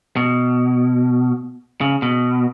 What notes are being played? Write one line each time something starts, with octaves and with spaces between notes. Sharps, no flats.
B2
C#3
B2